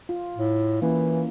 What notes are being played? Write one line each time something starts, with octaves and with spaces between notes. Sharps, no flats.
F4
A2
E3 A#3 C#4 E4